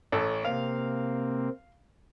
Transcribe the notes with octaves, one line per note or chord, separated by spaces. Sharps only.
A1 C#4 A4
C3 A#3 C4 F5